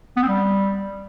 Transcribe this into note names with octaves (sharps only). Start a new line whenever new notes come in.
B3
C4
G3